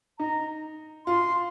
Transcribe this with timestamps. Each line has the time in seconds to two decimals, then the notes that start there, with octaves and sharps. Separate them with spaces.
0.19 D#4 A#5
1.06 F4 C6